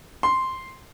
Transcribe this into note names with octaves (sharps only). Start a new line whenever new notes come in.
C6